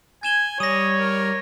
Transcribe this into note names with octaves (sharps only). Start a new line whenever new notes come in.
G#5 G#6 E7 G7
G3 C#5 D#6 A#6 D#7
A#4